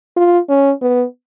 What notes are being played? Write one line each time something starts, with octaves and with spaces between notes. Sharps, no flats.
F4
C#4
B3